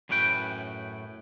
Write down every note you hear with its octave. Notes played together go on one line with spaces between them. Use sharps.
F#2 A2 C#4 B4 G5